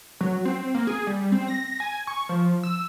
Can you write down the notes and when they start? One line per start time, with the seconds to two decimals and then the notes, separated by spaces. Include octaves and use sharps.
0.21 F#3
0.45 C4
0.75 A#3
0.87 G#4
1.07 G3
1.32 C4
1.48 A#6
1.64 A#6
1.80 G#5
2.07 C#6
2.29 F3
2.63 E6